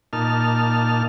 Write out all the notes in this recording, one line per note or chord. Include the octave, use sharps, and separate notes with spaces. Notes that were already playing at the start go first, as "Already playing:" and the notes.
A#2 D#4 A5 F6